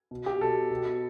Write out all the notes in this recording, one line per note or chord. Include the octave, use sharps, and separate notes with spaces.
B2
G4
B2 A4
B2